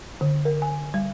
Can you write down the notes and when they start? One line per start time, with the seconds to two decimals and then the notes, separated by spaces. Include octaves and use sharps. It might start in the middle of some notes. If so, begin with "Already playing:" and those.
0.21 D3
0.45 A#4
0.62 G#5
0.94 G3